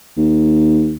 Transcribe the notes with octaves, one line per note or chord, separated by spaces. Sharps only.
D#2